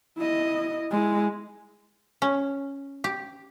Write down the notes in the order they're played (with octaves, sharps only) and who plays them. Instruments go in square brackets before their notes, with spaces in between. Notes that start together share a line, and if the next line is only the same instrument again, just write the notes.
[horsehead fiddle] E4 D#5
G#3 E4
[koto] C#4
G4